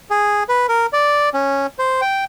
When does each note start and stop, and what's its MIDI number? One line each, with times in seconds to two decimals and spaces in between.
0.10 0.44 68
0.49 0.66 71
0.69 0.86 70
0.93 1.29 74
1.34 1.67 61
1.79 2.01 72
2.01 2.24 79